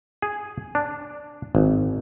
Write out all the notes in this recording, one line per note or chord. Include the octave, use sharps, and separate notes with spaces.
G#4
D4
G#1